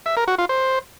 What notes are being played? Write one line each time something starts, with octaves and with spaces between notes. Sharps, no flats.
E5
A#4
F#4
F4
C5